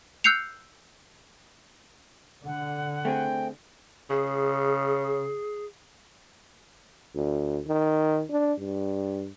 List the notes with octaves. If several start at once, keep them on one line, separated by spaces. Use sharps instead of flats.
E6 F#6 G6 C7 C#7 F7
D3 F#5
A3 C4 G#4 G5
C#3 G#4
D2
D#3
D4
G2